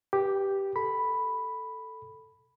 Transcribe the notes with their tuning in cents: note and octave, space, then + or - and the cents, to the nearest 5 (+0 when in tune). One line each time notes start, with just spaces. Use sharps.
G4 +0 B4 -15
A4 +5 B5 +0